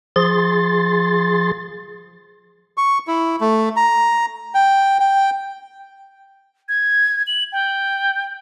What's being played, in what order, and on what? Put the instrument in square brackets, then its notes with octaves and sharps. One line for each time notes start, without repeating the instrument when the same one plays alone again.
[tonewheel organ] F3 G#4 C6 A6
[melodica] C#6
E4
A3
A#5
G5
G5
[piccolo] G#6
F#7
G5